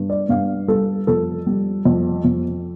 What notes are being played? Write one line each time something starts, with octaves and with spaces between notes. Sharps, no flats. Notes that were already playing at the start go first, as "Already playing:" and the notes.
Already playing: G2
D5
G2 F5
G3 A4
F2 A4
G3
F2
F2